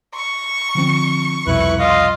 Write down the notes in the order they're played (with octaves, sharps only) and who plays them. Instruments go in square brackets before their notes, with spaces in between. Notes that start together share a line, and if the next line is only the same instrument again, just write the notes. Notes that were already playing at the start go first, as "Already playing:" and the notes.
[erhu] C#6
[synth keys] D3 F3 C4
[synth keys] C2 F2 B2 [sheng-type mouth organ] E4 B4 F#6
[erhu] F4 [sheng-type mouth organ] D#5 F5